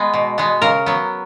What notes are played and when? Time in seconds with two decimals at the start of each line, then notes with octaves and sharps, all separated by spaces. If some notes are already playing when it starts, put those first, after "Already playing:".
Already playing: G#3 B3 B4
0.14 B2
0.38 G#3 B3
0.62 C#3 A#4
0.86 F#3 B3